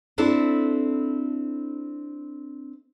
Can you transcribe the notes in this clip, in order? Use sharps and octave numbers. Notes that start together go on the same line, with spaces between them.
C4 D4 E4 A4